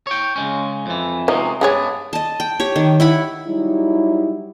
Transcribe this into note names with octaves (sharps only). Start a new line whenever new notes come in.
C#5 G5
C#3 G#3 C#4
F2 E3
C3 F3 F#3 G#3 B3 D#4
G2 G#3 B3 D4 G#4 C#5
D#5 A5
G5
G4 C#5
D#3
E4 F#5 B5
F#3 G3 D#4 E4